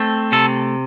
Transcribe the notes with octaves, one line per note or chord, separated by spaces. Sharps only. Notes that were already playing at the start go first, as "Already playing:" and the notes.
Already playing: A3 C4
C3 A4